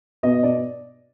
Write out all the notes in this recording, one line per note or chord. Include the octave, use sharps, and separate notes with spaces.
B2 D#5
B2 D5